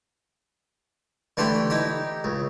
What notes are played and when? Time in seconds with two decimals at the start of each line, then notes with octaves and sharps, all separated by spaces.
1.37 D3 E3 A3 G4 C6
1.70 D#4 E4 G4
2.24 C#2